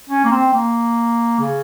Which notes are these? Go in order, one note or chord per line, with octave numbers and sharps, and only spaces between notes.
C#4
A#3
C4
A#3
C#3